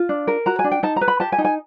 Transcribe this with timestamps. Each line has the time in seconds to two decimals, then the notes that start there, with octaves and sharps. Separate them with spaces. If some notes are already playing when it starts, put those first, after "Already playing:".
Already playing: F4
0.09 D4
0.27 A#4
0.46 F#4 A#5
0.59 G#5
0.64 D4
0.71 G5
0.83 D#4 A5
0.96 A#5
1.01 B4
1.08 B5
1.20 G4 A5
1.32 G#5
1.38 D#4
1.45 G#5